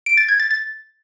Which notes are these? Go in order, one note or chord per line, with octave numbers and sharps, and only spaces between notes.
D7
A6
G#6
A6
A6